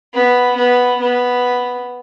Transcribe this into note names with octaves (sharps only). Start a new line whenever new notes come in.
B3
B3
B3